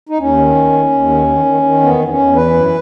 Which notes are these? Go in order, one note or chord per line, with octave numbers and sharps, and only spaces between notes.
D#4
D#2 C#4
D#3
D#2
D#2
D#2
D#3
D#3
D#3
D#3
E2 B3
E2 B3
C#4
E2
E3 B4
F#2